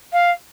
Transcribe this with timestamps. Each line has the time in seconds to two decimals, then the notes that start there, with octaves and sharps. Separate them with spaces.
0.13 F5